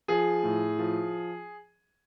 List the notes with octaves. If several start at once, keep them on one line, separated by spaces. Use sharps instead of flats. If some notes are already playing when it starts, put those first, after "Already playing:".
F3 G#4
A2
F3